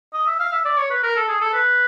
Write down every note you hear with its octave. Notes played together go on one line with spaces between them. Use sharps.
D#5
E5
F5
E5
D5
C#5
B4
A#4
A4
G#4
A4
B4